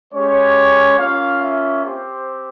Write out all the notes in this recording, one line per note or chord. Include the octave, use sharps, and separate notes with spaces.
G#3 C#4 G4 C#5
A#3 C#4 F4 F5
E5
C4 G4 C5